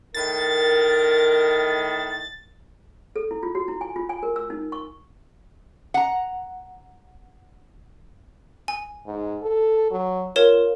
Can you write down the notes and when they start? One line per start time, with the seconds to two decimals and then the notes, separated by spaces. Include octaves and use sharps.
0.14 A2 D#3 A#4 A6
3.16 A4
3.31 E4
3.43 F4
3.55 F#4
3.68 E4
3.81 G#5
3.96 F4
4.09 G#5
4.23 A#4
4.36 E6
4.50 D#4
4.72 C#6
5.94 F#5 A#5
8.68 G#5
9.07 G#2
9.43 A4
9.91 F#3
10.36 F4 A#4 C#5 E7